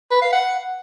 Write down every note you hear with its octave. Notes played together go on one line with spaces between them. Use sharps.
B4
F5
F#5